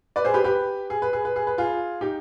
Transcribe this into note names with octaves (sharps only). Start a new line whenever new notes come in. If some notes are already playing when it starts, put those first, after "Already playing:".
B4 D5
G#4 C5
G4 B4
G4 B4
G#4
B4
G#4
B4
G#4
B4
F4 G#4
D#4 G4